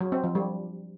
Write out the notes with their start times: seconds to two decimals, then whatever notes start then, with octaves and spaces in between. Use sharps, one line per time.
0.01 F#3
0.12 C4
0.24 F3
0.35 G3